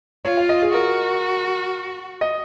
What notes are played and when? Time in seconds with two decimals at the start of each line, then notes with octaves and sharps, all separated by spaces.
0.25 F4 C#5
0.37 F5
0.49 D#5
0.62 G#4
0.73 F#4 A#4
2.21 D#5